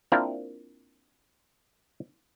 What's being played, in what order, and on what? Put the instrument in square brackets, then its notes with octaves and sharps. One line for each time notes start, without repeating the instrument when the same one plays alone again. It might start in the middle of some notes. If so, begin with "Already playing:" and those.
[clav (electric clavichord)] A#3 C4 D4 E4 F4 A#4